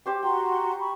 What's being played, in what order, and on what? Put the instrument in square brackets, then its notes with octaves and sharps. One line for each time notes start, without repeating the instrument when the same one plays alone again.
[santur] G4 C5 D6
[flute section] F#4 A#5 C6 [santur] G5
[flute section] B5 C#6